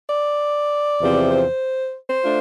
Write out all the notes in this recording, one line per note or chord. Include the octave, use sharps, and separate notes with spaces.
D5
E2 C3 F3 C4
C5
C5
A3 D4 F4